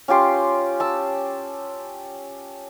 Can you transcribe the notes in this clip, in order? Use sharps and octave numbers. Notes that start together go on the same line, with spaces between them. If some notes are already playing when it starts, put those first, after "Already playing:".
C#4 F4 G4 C6
A5 E6